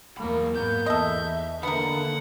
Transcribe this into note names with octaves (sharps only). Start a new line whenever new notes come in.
E2 A#2 F#3 A#3 B5
G#2 A#3 B3 G6
E2 A4 D#5 E5
D3 D#3 A#3 B3 D4 A#4 F#5